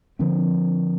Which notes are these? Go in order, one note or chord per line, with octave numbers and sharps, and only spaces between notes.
D3 F3 C4